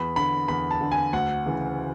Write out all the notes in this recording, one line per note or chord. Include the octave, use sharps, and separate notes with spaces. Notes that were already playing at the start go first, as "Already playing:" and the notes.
Already playing: E2 B5
D3 B5
E2 B5
A5
D3
G#5
D2 F#5
C#3 E3